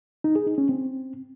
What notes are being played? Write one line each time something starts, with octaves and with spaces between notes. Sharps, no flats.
D#4
G#4
D#4
C#4
C4